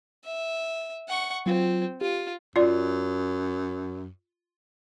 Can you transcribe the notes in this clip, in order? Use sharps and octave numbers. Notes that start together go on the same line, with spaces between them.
E5
F#5 C#6
F#3 C4 F4
F4 G4
F#2 F4 D5